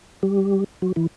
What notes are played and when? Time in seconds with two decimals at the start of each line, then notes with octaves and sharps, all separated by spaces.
0.23 G3 G4
0.82 F#3 F#4
0.96 E3 E4